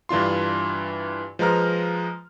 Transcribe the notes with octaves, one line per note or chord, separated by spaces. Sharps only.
G2 E3 D4 F4 C6
F3 G#3 B4 A#5 F6